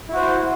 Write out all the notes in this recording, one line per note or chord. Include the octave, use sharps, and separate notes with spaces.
E4 F#4 C5